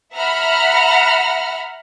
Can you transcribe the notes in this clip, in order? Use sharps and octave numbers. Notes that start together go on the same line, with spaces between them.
E5 F#5 A#5 B5 F6